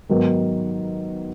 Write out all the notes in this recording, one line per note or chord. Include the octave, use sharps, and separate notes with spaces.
G#2 D#3 F#3 B3